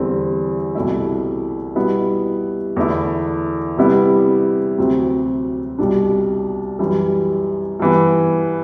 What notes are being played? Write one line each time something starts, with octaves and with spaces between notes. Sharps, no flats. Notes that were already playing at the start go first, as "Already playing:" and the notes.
Already playing: E2 D3 G3 C4 E4
C2 B2 A3 E4
B2 G3 B3 E4
E2 D3 A3 E4
C3 G3 B3 E4
D2 C3 F#3 C4
C2 B2 G3 D4
F#2 E3 G3
G2 E3 B3